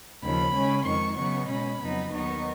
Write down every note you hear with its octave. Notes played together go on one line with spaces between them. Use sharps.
D#2 C#3 F3 B5
C#3 G#3 C#4
F2 D#3 G#3 C#6
C#3 F#3 B3 D#4 C#6
B2 G#3 C#4 B5
F2 C#3 F#3 B3 D#4
D#2 D#3 F#3 B3 D#4 C#6